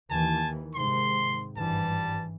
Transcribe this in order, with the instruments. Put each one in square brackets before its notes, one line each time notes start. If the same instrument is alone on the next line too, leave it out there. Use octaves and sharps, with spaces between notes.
[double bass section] D#2 D#3 E3 [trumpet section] G#5 A5
[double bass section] G#2 C3 D#3 [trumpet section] C6
[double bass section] G#1 G2 E3 [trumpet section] G3 A5